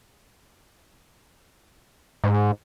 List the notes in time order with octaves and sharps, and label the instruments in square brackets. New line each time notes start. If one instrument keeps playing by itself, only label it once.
[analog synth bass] G#2